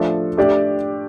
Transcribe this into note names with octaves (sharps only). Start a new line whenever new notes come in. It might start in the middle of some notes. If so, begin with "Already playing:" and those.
Already playing: F3 A3 D4 A4
A3 D4 G4 D5